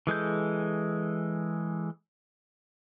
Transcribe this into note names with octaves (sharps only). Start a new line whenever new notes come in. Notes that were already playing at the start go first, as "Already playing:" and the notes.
E3 G#3 A4 G6